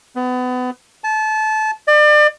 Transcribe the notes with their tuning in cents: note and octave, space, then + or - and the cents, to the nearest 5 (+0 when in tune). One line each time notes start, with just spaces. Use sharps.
B3 +30
A5 -25
D5 +35